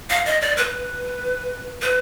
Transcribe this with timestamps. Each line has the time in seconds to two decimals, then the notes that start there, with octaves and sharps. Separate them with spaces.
0.10 F5
0.25 D#5
0.41 D5
0.57 B4
1.82 B4